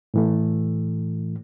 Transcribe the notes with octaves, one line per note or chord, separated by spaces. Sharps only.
A2 E3 A3